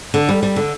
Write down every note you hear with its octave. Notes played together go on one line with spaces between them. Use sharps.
D3
G3
G3
D3